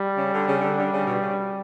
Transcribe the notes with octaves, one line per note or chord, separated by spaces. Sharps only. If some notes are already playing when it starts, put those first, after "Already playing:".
Already playing: G3
C#3
D3
C#3
D3
D3
C#3
B2
C#3